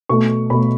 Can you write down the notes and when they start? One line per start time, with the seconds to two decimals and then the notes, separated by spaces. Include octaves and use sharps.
0.09 B2 A3 C#6
0.50 B2 A3 B5